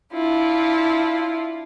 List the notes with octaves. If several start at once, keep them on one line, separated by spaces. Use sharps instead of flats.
D4 E4 F4